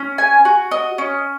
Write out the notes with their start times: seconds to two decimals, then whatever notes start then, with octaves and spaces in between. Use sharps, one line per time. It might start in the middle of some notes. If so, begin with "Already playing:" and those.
Already playing: C#4
0.18 G#5
0.45 F#4
0.71 D#5
0.98 C#4